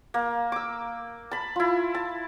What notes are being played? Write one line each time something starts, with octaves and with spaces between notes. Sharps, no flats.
A#3
D6 E6
A5 B5
E4 F4
A5